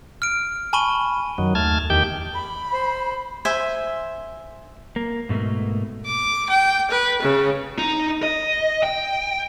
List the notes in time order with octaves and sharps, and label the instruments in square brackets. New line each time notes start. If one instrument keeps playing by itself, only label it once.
[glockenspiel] F6 D7
G#5 A5 B5 C#6 D#7 G7
[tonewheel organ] F#2 D#3 F#3
D#2 A3 A5 F6 G#6
E2 D#3 G4 G5 G6
[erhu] B5
[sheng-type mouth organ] C5
[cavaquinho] C5 E5 G#5
[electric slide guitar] A#3
G#2 B2 A3 A#3
[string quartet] D6
G5
B4
C#3
[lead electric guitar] D#4
D#5
G5